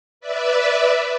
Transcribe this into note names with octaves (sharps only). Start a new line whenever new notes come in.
B4 D5 E5